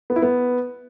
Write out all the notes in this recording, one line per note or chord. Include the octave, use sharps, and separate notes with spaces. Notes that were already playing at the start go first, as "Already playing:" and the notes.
B3
E4
B3